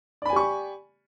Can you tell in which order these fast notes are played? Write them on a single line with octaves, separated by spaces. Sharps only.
D5 B5 G#5 G4 C#6